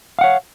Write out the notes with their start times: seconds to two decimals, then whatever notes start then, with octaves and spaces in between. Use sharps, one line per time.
0.19 F5
0.21 F#5
0.24 C#5